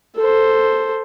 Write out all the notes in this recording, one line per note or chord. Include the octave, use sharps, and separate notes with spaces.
A4 C5